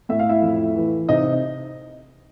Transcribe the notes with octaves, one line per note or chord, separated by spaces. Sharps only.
A2 E5
F5
E4 E5
F2
E3
C3 D#4 D#5